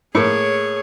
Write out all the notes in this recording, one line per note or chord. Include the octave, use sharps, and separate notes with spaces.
A2 A#3 G#4 C#5